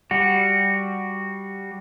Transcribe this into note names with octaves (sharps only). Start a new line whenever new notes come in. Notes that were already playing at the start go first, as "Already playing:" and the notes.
G3 F#4